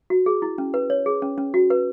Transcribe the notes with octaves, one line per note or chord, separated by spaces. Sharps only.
F#4
G#4
E4
C#4
B4
C#5
G#4
C#4
C#4
F#4
B4